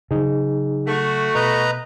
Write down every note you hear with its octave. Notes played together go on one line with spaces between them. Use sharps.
C#3 F#3 D#4 G#4
A3 F#4
B2 B4 D#5 A#5